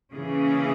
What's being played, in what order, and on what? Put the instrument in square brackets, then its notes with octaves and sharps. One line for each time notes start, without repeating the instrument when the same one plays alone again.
[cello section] C#3 E3 A#3 C#4 G#4